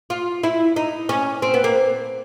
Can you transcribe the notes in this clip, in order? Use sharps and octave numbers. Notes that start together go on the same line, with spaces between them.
F4
E4
D#4
C#4
C4
B3
A#3